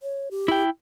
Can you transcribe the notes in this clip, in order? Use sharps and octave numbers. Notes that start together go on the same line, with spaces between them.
C#5
G4
E4 G5